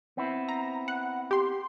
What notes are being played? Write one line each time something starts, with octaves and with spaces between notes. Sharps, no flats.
B3 C4 E4
A#5
F#5
G4 C6